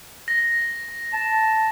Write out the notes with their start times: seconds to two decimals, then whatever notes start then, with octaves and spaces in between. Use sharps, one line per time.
0.28 A#6
1.13 A5